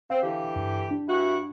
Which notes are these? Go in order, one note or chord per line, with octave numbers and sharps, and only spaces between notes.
C4 F5
D3 E3 G4
G2
D4
G2 E4 F#4